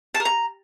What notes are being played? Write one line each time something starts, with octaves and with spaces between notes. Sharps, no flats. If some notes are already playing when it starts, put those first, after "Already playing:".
A5
A#4
A#5